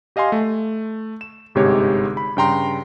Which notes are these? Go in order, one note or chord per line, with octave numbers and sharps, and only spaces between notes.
G4 D#5 F5 G#5 C6
A3
E7
G1 G#2 C3 G#3 G4 C#5
B5
G2 C#3 G5 A#5 C6